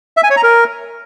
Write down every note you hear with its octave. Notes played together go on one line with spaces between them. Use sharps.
E5
G#5
C#5
A#5
A#4